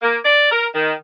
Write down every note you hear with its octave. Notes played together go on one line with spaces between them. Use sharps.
A#3
D5
A#4
D#3